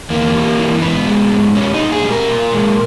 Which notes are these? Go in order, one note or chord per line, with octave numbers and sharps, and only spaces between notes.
E2 A#3
G3
E3
G#2 B3
G#3
G#2
G3 C#4
D#4
A#2
G#4
G3
A#4
A#2
G#3